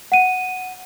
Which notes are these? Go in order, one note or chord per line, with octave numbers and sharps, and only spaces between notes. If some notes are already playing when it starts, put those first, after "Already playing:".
F#5 D#7